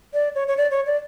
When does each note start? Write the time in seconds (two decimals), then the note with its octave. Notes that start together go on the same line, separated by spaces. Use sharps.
0.14 D5
0.35 C#5
0.48 C#5
0.57 D5
0.71 C#5
0.86 D5